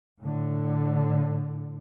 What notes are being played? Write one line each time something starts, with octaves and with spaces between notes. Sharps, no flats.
A2 D3